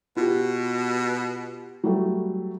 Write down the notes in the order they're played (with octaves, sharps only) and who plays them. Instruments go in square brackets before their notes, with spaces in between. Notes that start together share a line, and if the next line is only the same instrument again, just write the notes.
[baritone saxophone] B2 [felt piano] F4 G4
[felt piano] F#3 G3 A3